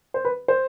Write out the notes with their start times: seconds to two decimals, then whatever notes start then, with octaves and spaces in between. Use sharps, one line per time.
0.14 C5
0.25 B4
0.48 C5